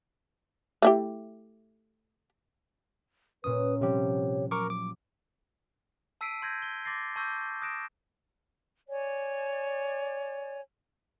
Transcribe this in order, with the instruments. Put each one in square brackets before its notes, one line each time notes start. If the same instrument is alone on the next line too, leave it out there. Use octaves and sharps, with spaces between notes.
[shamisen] A3 E4 G4
[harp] A#2 A#3 C#4 [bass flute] B4 [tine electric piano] D#6
[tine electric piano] C3 G4 [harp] F3 G3 F#4 [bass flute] C#5
[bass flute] F#3 [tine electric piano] A#4 C#6 D6
[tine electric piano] D6
[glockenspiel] A5 E6 B6 C7 D7 D#7
C6 G6 G#6 A#6
G7
C6 D6 A6 A#6 C7
A5 C#6 D6 E6 G6 A#6
D#6 F#6 A#6 D7 E7
[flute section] C#5 D5 G#5